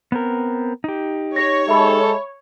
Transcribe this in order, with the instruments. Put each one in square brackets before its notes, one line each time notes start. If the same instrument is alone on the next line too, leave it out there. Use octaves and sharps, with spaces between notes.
[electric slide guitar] B3 C4 A#4
D#4 G4
[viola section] C#5 [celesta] A#6
[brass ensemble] G#3 A4 [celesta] E5 B5